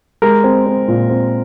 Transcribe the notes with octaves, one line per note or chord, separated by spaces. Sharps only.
G#3 A#4
C4
C4
A#2
C4